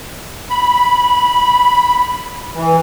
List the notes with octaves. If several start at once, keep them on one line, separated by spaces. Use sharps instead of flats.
B5
E3